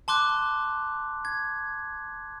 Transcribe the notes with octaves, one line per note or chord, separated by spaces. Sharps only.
A5 C6 D6 F#6
G#6